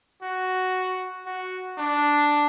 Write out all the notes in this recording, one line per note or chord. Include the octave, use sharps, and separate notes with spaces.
F#4
F#4
D4